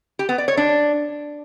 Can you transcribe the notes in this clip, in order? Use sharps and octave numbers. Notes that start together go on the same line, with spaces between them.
G4
B3
D5
C#5
D4